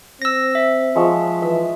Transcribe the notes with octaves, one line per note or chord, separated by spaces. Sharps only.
C4 E6 A#6
E5
F3 G#3 C#6
E3 E5